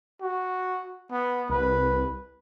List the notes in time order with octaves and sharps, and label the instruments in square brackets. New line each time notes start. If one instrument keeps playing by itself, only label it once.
[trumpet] F#4
B3
[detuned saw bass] C2 [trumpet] B4